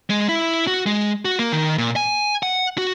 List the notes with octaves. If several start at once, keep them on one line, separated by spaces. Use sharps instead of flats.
G#3
E4
F#4
G#3
F#4
A#3
D#3
A#2
G#5
F#5
F#4